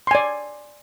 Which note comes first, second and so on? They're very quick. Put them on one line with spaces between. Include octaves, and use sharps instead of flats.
C6 G#5 D5